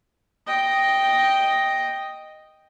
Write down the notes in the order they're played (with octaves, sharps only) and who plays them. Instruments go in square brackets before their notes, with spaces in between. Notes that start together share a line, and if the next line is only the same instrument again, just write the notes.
[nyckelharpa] D#5 G5